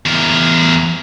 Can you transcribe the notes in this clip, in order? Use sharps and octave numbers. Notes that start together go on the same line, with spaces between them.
E2 A#4